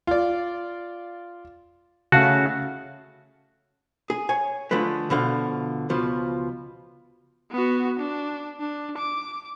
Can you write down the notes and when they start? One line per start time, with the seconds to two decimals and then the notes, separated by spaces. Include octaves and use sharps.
0.07 F4 D5
2.12 C#3 A3 F#4 F5 A5
4.10 G#4
4.29 C#5 G#5
4.71 D3 F3 G#3 A3 B4
5.10 B2 D3 F3 F5
5.90 C#2 B2 F3
7.51 B3 F#4
7.99 D4
8.60 D4
8.98 D6